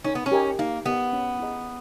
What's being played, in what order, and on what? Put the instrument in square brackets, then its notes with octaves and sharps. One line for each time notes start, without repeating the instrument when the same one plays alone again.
[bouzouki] C#4 [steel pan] D#4
[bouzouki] B3
C#4
[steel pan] G4 A#4 D#5 G#5
[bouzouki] A#3 [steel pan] D#4
[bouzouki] B3 [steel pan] G4 A#4 D#5 G#5
[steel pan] C#4
E4 G#4 D#5 A#5